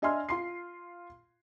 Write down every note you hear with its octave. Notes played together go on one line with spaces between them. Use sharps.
D4 D#5 E5 G#5 C6 F6
F4 C6 C7